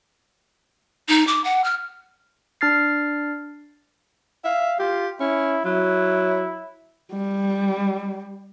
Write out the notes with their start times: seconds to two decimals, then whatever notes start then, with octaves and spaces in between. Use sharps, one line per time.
1.08 D#4
1.27 D6
1.44 F#5
1.64 F6
2.61 D4 F6 A6 C7
4.45 E5 F5
4.79 F4 G4
5.20 C#4 E4
5.65 F#3 E4
7.12 G3